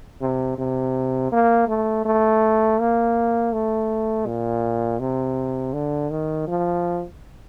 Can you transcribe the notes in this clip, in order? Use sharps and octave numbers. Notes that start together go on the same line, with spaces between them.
C3
C3
A#3
A3
A3
A#3
A3
A#2
C3
D3
D#3
F3